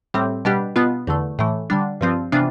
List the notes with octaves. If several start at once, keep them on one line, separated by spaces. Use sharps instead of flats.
A2 G3 C4
B2 G3 D4 G4
B2 B3 F4
E2 D3 A3
A2 E3 A3
D3 G3 D4
G2 F3 C4 F4
C3 E3 B3 D4 F4